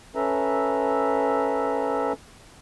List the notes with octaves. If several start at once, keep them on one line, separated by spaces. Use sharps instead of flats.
C#4 A4 B4 E5 A#5